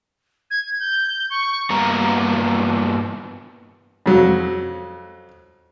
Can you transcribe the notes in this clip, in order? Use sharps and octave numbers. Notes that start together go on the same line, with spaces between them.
G#6
G6
C#6
G2 A#3 B3 A#5
F2 F#3